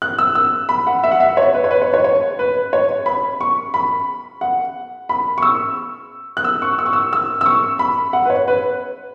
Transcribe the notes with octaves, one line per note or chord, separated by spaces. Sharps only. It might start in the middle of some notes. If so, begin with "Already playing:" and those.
F#6
E6
E6
B5
F#5
E5
F#5
E5
C#5
B4
C#5
B4
C#5
C#5
C#5
B4
C#5
B5
C#6
B5
F#5
B5
C#6
E6
F#6
E6
C#6
E6
C#6
E6
E6
E6
C#6
B5
F#5
B4
C#5
B4